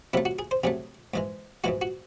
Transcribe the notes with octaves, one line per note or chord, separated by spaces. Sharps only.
C3 F#3 A3 E4
F#4
G#4
C5
C3 F#3 A3 G#4
G#2 E3 G#3
G#2 E3 G#3 F#4
F#4